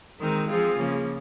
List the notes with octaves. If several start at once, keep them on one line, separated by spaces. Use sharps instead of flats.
D#3 G#3 C4 D#4 A#4
F3 C4 F4 G#4
C#3 F3 A#3